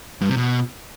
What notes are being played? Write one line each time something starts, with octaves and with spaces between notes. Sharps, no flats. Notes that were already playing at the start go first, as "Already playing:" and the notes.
G2
C3
B2